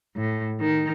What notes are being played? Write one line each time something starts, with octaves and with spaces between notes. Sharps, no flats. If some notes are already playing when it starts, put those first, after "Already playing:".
A2
D#3